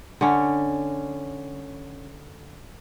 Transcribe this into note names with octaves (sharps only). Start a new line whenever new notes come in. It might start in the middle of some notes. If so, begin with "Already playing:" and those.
D3 C#4